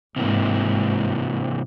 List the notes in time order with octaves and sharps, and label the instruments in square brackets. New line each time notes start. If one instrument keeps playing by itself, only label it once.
[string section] G1 G#2 [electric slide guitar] C3 E3 A#3